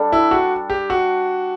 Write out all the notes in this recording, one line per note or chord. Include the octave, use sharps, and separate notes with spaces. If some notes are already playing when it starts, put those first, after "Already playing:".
Already playing: G3 D4 A4
E4
F#4
G4
F#4